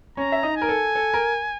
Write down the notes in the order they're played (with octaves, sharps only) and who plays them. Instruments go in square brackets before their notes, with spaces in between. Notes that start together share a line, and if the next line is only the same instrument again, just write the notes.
[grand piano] C#4 C#5 [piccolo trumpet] A#5
[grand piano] E5
D#4 D#5
[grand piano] A#4 [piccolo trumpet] G#5
[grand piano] A4
A4
A#4